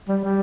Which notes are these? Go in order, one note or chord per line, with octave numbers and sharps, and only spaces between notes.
G3
G3